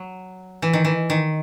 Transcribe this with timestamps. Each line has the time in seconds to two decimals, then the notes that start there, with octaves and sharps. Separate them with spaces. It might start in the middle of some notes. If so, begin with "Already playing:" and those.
Already playing: F#3
0.62 E3
0.73 D#3
0.85 E3
1.10 D#3